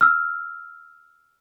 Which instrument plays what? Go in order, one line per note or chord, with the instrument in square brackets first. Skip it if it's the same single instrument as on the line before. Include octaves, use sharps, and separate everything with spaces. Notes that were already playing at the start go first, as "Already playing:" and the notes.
[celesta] E6 F6